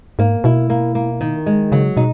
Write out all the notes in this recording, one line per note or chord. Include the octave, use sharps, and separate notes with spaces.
G#2 A#3
B2 E4
A#3
A#3
D#3
G#3
C#3 F#3
B2 D#4